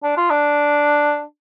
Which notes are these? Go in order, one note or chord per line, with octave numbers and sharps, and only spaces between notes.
D4
F4
D4